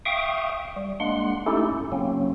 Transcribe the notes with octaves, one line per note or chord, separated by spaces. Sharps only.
E5 F5 G5 C#6 D#6
G3
G#3 A#3 D4 F#5 C6
A3 C#4 D#4 E4 G4 A4
G2
C#3 F#3 A#3 C4 C#4